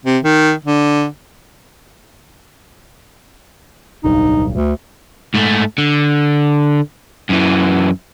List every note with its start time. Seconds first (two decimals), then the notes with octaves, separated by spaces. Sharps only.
0.05 C3
0.23 D#3
0.65 D3
4.04 D1 B1 G2 D#4
4.53 D2
5.34 G#2 A3
5.78 D3
7.29 F#2 E3